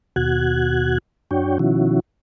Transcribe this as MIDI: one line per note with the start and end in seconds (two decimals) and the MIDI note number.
0.16 0.98 39
0.16 0.98 47
0.16 0.98 66
0.16 0.98 90
0.16 0.98 92
1.31 1.58 42
1.31 1.58 62
1.31 1.58 66
1.31 1.58 73
1.31 1.58 79
1.59 2.00 47
1.59 2.00 51
1.59 2.00 53
1.59 2.00 61
1.59 2.00 64
1.59 2.00 66